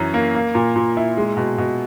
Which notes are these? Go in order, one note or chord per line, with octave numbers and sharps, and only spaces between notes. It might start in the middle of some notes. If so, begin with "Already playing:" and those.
Already playing: F#2 E3 C#4
A#3
A#3
A#2
A#2
E4
G#3
B2
B2